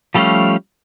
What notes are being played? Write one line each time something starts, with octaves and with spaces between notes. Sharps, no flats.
F3 G3 A3 C#4 F5